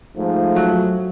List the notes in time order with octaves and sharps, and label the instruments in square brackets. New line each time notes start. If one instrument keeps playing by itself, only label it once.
[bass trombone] G#2 [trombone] F3 [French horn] A3
[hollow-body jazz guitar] F#3